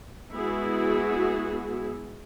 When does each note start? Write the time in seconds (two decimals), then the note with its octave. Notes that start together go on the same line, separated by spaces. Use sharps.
0.31 G#3 B3 E4 F#4 G#4